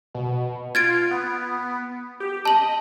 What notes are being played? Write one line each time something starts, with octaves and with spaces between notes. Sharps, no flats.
B2
F4 G#6 A6 D7
B3
G4
D#5 A5 F#7